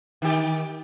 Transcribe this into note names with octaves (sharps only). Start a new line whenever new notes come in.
D#3 G4